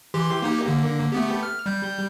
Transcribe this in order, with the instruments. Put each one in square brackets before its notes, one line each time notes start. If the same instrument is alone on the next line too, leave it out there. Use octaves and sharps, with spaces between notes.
[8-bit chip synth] E3 G4 C6
A#3 D#4 G4
D3 A#3
A3 B3 G4
F6
G3 G6